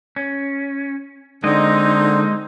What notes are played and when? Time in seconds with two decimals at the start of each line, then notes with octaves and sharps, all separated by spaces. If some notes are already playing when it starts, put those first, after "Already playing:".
0.16 C#4
1.44 D3 G#3 A#3 C4 D#4 D#5